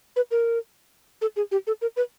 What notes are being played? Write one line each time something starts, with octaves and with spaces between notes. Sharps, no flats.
B4
A#4
A4
G#4
G4
A4
A#4
B4